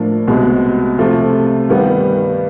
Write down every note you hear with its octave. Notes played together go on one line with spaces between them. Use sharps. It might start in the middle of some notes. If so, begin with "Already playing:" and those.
Already playing: A2 F3 A#3 D4
C2 B2 G#3
C3 F3 A3
G2 D#3 G3 B3